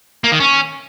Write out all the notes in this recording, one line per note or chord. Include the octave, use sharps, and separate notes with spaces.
A#3
D#3
C#4